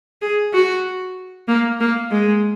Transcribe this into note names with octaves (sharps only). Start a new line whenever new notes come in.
G#4
F#4
A#3
A#3
G#3